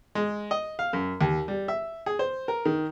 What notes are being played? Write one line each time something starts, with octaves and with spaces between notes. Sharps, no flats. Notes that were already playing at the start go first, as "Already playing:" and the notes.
G#3
D#5
F5
F#2
D#2
G3
E5
G#4
C5
A#4
D#3